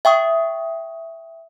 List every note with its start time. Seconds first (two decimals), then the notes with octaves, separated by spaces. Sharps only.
0.05 E5 G5 C#6 D#6